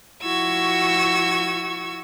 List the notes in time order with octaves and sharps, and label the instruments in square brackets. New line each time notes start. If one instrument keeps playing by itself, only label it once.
[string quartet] F3 E4 F#4 C#6 E6 G#6